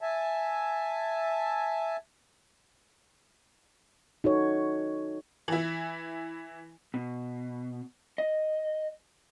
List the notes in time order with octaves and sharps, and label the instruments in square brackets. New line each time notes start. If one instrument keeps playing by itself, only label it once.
[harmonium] E5 G#5 A5
[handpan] D#4 F#4 A4 C#5
[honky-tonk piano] E3 E4
[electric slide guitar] B2
D#5